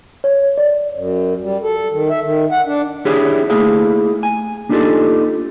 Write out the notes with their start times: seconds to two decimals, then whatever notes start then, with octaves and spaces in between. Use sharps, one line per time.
0.24 C#5
0.58 D5
0.95 F#2
1.41 G3
1.63 A4
1.91 D#3
2.10 E5
2.22 D#3
2.51 F#5
2.66 D4
3.05 D4 E4 G4 G#4 C#5
3.50 A3 A#3 E4 G#4 F5
4.23 G#5
4.69 A#3 D4 D#4 F4 G4 A4